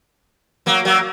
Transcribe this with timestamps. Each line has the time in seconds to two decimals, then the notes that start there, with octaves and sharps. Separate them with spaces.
0.66 F#3 A#3
0.85 F#3 A#3